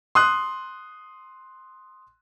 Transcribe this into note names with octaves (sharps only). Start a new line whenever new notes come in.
C6 D#6 F#6